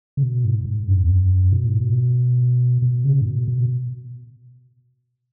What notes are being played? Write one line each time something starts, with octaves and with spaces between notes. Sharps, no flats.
C#3
B2
G#2
G#2
F#2
E2
F#2
B2
G#2
B2
B2
C#3
G#2
B2
B2